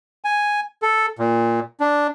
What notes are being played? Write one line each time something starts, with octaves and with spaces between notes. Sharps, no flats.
G#5
A4
A#2
D4